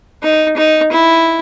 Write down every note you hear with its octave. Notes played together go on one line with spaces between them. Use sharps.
D#4
D#4
E4